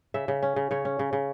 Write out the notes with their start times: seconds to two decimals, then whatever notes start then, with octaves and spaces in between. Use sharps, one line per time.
0.14 C#3 E5
0.28 C#3
0.43 C#4
0.56 C#3
0.71 C#3 C#5
0.85 C#4
0.99 C#3
1.13 C#3